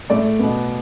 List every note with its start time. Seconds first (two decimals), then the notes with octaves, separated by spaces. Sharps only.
0.10 A2 A3 D5
0.39 B2 B3